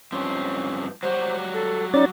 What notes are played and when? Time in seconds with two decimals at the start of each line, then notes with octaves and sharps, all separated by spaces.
0.12 G2 F3 C4 C#4
1.03 F#3 G3 F#4 C5
1.54 A4
1.94 C#4 D#4 D5 A6